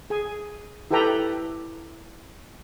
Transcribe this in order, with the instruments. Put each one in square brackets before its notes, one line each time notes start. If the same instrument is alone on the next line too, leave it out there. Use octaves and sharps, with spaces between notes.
[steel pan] G#4 G#5
E4 G4 A4 B4 G5 A#5